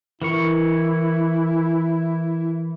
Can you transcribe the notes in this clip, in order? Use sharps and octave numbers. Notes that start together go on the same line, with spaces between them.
E3 E4 A#4 C#6